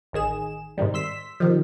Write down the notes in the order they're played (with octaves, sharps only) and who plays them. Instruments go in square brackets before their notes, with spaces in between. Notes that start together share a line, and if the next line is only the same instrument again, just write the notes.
[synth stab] A1 D#3 G#4 E7
G#2 C3 D#3 G3
C6 E6 B6
C3 D#3 F3